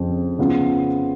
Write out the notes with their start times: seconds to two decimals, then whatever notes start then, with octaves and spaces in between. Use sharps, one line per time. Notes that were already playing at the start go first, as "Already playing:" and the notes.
Already playing: F2 C#3 F3
0.39 C#3 G#3 B3 F4